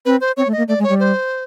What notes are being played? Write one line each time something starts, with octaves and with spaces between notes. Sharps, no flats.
C4 B4
C5
C4 C#5
A3
A#3 D#5
A3 D5
G#3
C#5
G3
C5